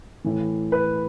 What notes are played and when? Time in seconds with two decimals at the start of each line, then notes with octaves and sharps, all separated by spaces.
0.24 A2 E3
0.72 B4